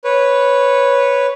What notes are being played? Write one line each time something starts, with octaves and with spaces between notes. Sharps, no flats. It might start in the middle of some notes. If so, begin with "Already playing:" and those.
B4 C#5